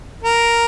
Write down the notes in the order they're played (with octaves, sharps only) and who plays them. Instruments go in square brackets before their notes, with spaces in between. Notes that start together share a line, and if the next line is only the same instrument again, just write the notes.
[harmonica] A#4